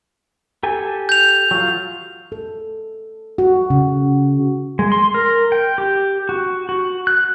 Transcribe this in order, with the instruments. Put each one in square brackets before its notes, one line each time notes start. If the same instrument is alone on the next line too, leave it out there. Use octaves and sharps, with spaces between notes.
[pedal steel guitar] G4 A4 G#5
[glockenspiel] G6 F7
[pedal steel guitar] F#3 F4
[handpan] A4
F#4
C#3
[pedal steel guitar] G#3
C6
A#4
G5
G4
F#4
F#4
F#6